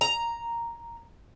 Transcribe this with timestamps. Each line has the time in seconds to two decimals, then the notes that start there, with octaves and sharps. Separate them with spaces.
0.01 A#5